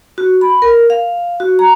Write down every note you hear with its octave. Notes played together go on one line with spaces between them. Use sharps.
F#4
B5
A#4
F5
F#4
A#5